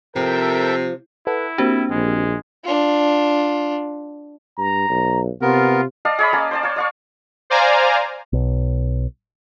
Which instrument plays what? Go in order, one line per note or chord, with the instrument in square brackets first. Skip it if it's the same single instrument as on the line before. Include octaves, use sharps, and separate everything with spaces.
[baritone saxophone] C3 [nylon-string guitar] F3 [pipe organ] A4 E5 G5 [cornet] A#4
[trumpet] E4 [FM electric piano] A4 B4 F#5
[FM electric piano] A#3 C4 G4 [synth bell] D4 F#4
[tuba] A#1 [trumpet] G#3
[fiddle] D4 F4
[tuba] G2 [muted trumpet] A#5
[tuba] B1
[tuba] C3 [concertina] B3 A#4 [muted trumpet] F4
[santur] D5 D#5 F5 A5
G#4 C#5 D#5 B5
A#3 C#4 D5 A5
C5 D5 A5
C#5 F5
D5 F5 C#6
[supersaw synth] C5 D5 F5 G#5 A#5
[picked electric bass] B1